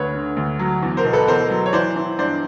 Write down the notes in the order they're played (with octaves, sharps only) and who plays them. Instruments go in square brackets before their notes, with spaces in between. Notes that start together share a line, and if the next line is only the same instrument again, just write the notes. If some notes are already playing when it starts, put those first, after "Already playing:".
Already playing: [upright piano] D2 B4 C#5
D3
D2
F#3
E2
A#4 C5
B2
A4 B4
E2 A#4 C5
F#3
C#5
E3 C5 D5
E3
G2 C5 D5